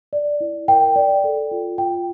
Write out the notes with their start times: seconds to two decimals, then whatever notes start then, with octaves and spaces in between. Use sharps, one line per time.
0.13 D5
0.40 E4
0.68 A#4 G5
0.96 D5
1.24 A4
1.51 F4
1.78 F4 G5